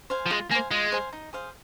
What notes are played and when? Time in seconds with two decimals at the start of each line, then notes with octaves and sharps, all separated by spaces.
0.10 C5 F5 G#5
0.26 F3
0.30 G#3 F4
0.51 A#3 C5 F5 G#5
0.71 G#3 F4
0.92 C5 F5 G#5
1.13 D#4
1.33 G#4 C5 F5